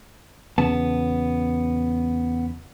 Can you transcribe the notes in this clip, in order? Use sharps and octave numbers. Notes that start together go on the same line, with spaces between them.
E2 C#3 B3 A5